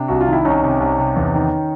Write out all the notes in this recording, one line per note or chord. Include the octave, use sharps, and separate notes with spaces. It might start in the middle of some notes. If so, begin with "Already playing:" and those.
Already playing: C3 D4
C2 F#4
F4
D#3 E4
C2 C#4 D#4
C3
C2
C3
E2
D#3